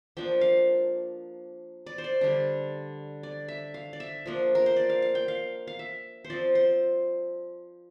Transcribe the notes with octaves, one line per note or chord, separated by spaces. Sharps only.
F3 A#3 D4 G5
F5
D5
C5
D5
D3 G3 D4
D5
E5
F5
D5
E5
F3 A#3 D4
A#4
C5
D5
F5
F5
G5
F5
F5
E5
C5
F3 C4 D5
C5